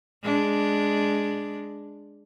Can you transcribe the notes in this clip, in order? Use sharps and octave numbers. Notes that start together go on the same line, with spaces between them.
G#3 D4